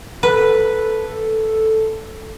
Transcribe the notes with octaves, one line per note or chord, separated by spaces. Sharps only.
A4 B4